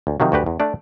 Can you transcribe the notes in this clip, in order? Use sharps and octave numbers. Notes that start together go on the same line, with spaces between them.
D2
C3 D#3 F3 F#3
D2 F#4 G4 B4
E2
A3 D4 D5